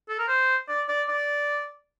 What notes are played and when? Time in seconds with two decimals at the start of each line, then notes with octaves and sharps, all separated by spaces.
0.09 A4
0.19 A#4
0.28 C5
0.68 D5
0.88 D5
1.08 D5